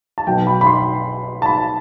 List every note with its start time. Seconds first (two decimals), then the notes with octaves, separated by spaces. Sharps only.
0.18 A5
0.27 B1 B2 G5
0.47 B5
0.61 B5
0.67 C6
1.42 A5
1.46 B5